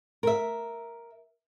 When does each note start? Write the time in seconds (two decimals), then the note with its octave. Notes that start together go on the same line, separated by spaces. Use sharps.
0.23 A#4 E5